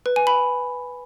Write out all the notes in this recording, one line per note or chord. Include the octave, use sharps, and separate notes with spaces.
B4
G#5
B5